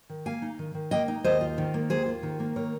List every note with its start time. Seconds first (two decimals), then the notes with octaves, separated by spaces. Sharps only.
0.10 D#3
0.26 A#3 F5 G#5
0.42 D#4
0.59 D#3
0.75 D#3
0.91 A#3 D#5 G5
1.08 D#4
1.24 D#2 C5 D#5
1.41 F4
1.58 D#3
1.74 A#3
1.89 D#2 G#4 C5
2.06 F4
2.23 D#3
2.40 A#3
2.56 D#3 A#4 C#5